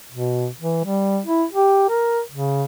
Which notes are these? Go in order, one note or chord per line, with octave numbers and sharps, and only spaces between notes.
B2
E3
G3
E4
G4
A#4
C#3